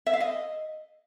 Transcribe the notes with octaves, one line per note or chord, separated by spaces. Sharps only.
E5
F5
D#5